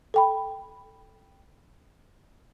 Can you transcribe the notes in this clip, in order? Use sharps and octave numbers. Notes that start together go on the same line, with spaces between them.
A4 G5 B5